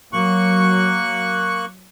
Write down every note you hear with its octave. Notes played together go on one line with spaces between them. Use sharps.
F#3 A#3 C#6 F#6